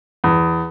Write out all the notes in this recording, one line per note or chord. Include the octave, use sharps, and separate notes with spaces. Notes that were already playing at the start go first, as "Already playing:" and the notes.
E2